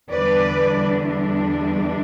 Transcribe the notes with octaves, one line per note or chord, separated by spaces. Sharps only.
E2 D3 G3 D4 B4 D5